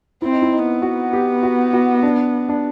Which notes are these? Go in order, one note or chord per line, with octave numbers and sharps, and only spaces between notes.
C4 E4
D#4
E4
D#4
B3
F#4
G4
F#4
F#4
D4
D4